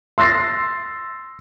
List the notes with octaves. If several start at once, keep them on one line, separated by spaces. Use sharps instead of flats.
C6 E6 A6 A#6 C7